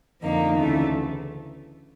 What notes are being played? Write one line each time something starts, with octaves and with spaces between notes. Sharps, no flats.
F2 D3 F3 A#3 D#4
D2 C#3 E3 A3